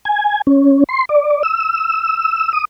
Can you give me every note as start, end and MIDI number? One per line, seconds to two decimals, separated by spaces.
0.05 0.41 80
0.47 0.84 61
0.89 1.05 84
1.09 1.43 74
1.43 2.52 88
2.53 2.65 87